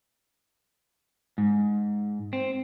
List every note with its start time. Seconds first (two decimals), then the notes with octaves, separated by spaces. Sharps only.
1.38 G#2
2.33 C4